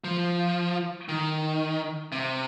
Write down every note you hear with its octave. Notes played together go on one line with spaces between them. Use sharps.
F3
D#3
C3